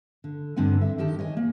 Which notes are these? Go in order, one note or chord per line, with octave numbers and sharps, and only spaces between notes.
D3
G2 D3 C4 F#5 G#5
E5
D#3 D#4 G4 A5
C#5 D#5 G#5
A#3